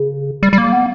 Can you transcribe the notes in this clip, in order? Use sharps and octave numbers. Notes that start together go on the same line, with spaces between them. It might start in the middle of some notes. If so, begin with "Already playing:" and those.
Already playing: C#3
G3
G3
A#3
B3